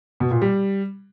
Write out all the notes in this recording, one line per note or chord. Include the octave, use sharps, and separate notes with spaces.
B2
A#2
G3